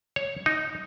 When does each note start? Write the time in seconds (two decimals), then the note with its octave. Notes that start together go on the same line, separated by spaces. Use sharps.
0.16 C#5
0.46 D#4